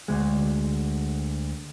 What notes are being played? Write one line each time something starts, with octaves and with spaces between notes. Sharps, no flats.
D2 G#3